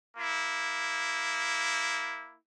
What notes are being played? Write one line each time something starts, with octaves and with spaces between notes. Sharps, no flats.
A#3 E4